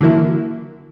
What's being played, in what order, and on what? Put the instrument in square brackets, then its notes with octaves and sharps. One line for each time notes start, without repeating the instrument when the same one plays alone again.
[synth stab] D3 E3 F#3 A#3 E4